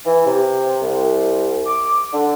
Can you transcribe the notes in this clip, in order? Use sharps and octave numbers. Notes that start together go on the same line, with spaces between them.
E3
C3
C2
D6
D3